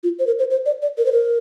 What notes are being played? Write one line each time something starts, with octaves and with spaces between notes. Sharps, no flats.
F4
C5
A#4
C5
C5
D5
D5
A#4
C5
A#4